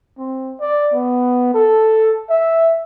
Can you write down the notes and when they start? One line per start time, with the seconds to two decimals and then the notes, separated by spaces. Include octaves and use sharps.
0.18 C4
0.60 D5
0.94 B3
1.54 A4
2.30 E5